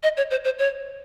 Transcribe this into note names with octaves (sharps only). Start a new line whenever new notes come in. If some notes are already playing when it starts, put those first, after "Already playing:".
D#5
C#5
C5
C5
C#5